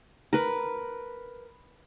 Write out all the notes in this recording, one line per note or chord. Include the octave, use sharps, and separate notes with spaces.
A#4 B4